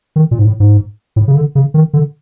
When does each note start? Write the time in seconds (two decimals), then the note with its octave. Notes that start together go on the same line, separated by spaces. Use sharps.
0.16 D#3
0.31 A#2
0.39 G#2
0.45 A2
0.60 G#2
1.16 A2
1.28 C#3
1.35 D3
1.55 C#3
1.74 D#3
1.93 D3